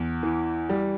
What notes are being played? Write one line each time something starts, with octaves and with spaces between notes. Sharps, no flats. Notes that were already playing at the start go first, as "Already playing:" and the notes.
Already playing: E2
E3
G3